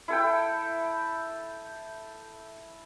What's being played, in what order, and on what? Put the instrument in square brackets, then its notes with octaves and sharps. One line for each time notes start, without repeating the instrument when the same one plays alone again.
[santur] E4 A4 G5